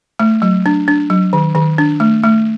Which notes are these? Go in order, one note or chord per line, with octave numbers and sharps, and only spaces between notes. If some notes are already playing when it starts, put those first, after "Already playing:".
A3
F#3
D4
D4
F#3
D#3
D#3
D4
A3
A3